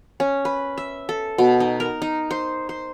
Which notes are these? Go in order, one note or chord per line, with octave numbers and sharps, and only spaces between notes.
C#4
B4
E5
A4
B2
D#4
A#4
D#4
C5
C5